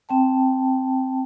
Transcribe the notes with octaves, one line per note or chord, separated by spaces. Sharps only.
C4 G5 A5